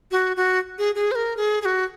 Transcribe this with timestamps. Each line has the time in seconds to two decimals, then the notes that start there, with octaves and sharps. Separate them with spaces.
0.11 F#4
0.37 F#4
0.78 G#4
0.95 G#4
1.11 C5
1.15 A#4
1.37 G#4
1.62 G#4
1.65 F#4